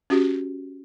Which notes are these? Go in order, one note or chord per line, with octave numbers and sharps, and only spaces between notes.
C#4 F#4 G4